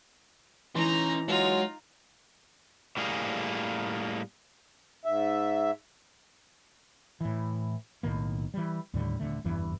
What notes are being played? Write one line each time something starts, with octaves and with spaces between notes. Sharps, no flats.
E3 C#4 D#4 A#5 C6
F#3 G#3 D#4 F4
A2 G3 A#3 G#4
G#2 E5
A2 E3
B1 A2 D#3 A#3
E3 G3
D#2 A2 D3 G3
D#1 G#1 D3 A3
F#1 E2 G2 E3